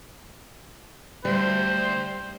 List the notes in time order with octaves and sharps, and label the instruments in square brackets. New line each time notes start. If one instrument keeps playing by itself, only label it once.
[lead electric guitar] D2 [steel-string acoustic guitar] G3 [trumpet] C5